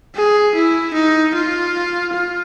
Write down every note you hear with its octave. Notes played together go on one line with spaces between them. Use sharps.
G#4
E4
D#4
F4
F4